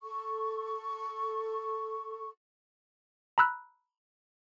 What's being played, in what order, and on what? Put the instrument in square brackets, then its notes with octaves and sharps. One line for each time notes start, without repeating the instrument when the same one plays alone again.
[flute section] A4 C#6
[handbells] A#5 B5 E6 F#6